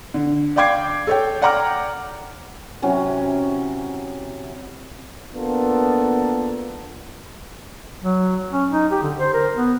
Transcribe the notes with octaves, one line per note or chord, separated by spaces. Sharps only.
D3
D5 F5 G5 D6 G#6 C7
A4 C#5 G5
D5 F#5 G5 A#5 D6 F6
C3 E3 F#3 C#4
A#3 B3 D4 F4 A4 A#4
F#3
C#4
D#4
G4
D3
C5
A#4
B3